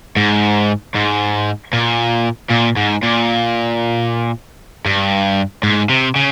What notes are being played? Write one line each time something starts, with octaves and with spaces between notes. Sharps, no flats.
G#2
G#2
A#2
A#2
G#2
A#2
G2
G#2
C3
C#3